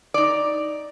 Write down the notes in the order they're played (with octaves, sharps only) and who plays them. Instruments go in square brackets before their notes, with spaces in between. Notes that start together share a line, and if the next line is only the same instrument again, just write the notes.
[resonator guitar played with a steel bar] D#4 D5